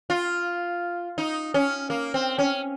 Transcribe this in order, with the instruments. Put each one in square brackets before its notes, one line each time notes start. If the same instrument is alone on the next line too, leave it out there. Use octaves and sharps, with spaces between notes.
[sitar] F4
D#4
C#4
A#3
C4
C#4